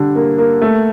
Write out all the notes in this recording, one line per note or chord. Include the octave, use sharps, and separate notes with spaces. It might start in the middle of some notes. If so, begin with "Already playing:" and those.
Already playing: D3 G3
A#3
A#3
A3